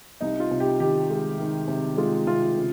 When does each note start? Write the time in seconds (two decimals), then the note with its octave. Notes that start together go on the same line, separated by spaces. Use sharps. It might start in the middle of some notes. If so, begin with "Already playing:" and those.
0.21 C2 D#4
0.40 F4
0.51 C3
0.60 G4
0.80 D#3 G4
1.10 G#3
1.39 D#3
1.68 C3
1.97 G#3 F4
2.27 C3 F4
2.57 C#3